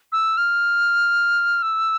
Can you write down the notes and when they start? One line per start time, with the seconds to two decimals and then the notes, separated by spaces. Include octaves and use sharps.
0.12 E6
0.37 F6
1.62 E6